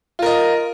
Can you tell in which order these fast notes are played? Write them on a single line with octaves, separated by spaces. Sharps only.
F4 A#4 D#5